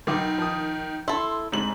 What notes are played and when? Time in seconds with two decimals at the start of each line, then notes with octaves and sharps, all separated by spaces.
0.07 B1 D#3 D6
0.38 F3 D#6
1.08 E4 A4 C6
1.52 F1 G#2 F#7